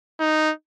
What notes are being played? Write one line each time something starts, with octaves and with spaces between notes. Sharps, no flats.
D#4